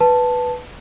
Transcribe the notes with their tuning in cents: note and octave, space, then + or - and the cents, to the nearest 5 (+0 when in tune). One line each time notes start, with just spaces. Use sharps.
B4 +0 A5 +0